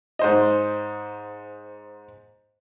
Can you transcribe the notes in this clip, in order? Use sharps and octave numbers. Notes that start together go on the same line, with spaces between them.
G#2 C5 D#5